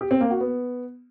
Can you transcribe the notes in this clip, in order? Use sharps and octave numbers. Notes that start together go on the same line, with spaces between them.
G4
C4
A#3
F#4
B3